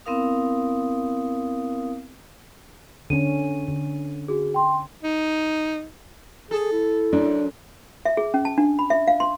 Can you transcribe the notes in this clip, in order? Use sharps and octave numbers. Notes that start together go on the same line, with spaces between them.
B3 C4 E4 A#4 F5 D#6
D3 C#4 D#7
D3
F#4 G#4
G5 C6
D#4
G#4 A4
E4
F#2 D4
E5
G#4
C#4
A5
D4
B5
E5
F5
C6